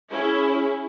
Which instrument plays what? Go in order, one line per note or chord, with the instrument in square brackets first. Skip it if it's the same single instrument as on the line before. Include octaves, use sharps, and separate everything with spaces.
[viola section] C#4 E4 G#4